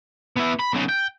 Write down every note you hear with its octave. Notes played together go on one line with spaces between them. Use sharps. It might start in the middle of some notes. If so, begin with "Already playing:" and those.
B3 E4
B5
B1 C#3
G5